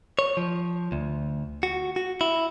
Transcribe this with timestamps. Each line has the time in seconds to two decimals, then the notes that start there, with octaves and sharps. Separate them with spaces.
0.19 C#5
0.37 F3
0.92 D2
1.63 F#4
1.96 F#4
2.21 E4